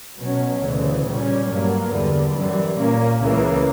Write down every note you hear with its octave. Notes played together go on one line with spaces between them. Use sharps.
B2 F#3 C#4
D2 C#3 E3
A#2 G3 C#4
G2 F#3 A#3
E2 D3 G3
F#2 E3 G3
A#2 A#3 C#4
C#2 C#3 E3 A#3